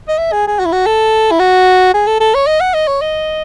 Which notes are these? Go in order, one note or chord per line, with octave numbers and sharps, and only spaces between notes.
D#5
E5
G#4
G#4
F#4
E4
F#4
A4
E4
F#4
G#4
A4
A4
C#5
D#5
F#5
D#5
C#5
D#5